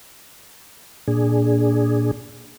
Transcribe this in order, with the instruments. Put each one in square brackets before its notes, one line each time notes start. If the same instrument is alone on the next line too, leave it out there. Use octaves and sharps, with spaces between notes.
[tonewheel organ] A#2 D4 G#4